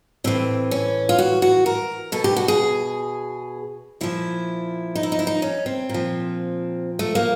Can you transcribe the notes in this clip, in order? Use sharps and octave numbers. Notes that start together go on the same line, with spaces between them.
A2 E3 C4
C#4
F4
F#4
F#4
A#4
B2 A4
G4
F#4
G#4
A#2 F3 E4
D#4
E4
D#4
E4
D#4
C#4
C4
A#2 F3
A3
A#3